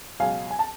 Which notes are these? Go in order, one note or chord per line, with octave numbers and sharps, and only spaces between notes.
C#2 B2 F#3 F5 G#5
G#5
A5